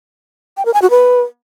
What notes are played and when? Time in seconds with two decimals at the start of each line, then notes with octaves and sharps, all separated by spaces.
0.57 G5
0.65 A#4
0.74 G#5
0.82 F#4
0.90 B4